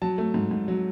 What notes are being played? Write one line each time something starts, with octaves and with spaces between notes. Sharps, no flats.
F#3 A5
A3
G#2
G#2
F#3